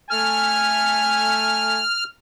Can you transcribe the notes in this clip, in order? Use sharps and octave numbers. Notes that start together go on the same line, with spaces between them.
A3 G#5 F6